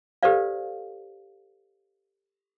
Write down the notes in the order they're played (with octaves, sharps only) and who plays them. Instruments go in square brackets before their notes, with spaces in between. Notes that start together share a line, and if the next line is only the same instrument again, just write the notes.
[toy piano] G4 A4 B4 C5 D5 F5